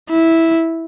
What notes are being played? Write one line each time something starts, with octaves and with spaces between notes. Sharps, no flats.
E4